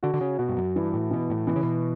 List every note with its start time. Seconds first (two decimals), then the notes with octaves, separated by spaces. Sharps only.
0.03 D3 F#4
0.14 D3
0.21 C#3
0.38 B2 F#4
0.49 G2
0.57 F#2
0.76 G2 E3
0.94 A2
1.11 B2 E3
1.30 A2
1.47 B2 E3
1.56 C#3
1.63 B2